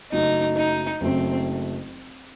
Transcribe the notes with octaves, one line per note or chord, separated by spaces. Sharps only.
F#1 F#2 F#3 A3 D#4
D#4
F#1 F#2 F#3 A3 C4